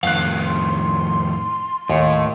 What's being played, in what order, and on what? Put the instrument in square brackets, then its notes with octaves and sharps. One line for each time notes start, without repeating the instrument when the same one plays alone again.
[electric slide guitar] F2 A2 D#3 [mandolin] F5 F#6
[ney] C6
[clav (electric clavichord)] D#2 [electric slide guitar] A2